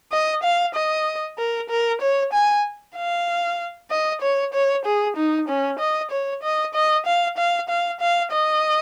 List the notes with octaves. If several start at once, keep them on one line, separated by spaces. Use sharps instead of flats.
D#5
F5
D#5
A#4
A#4
C#5
G#5
F5
D#5
C#5
C#5
G#4
D#4
C#4
D#5
C#5
D#5
D#5
F5
F5
F5
F5
D#5